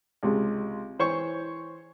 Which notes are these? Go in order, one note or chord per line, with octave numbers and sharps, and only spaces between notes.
C#2 C3 G#3
E3 C5 C#5 C#6